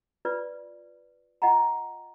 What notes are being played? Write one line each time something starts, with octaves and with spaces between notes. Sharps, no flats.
F4 B4 D5
F4 D#5 F#5 G5 A#5